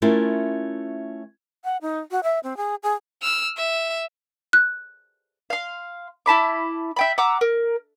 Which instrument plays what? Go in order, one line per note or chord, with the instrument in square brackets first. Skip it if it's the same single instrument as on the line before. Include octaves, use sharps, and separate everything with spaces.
[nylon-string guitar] A3 C#4 E4 F4 A#4
[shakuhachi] F#5
D#4
F#4
E5
C4
G#4
G#4
[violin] E6 F6
E5
[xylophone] F#6
[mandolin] F5 C6
E4 A5 B5 D6
E5 G5 B5
F#5 A#5 D6 E6
A#4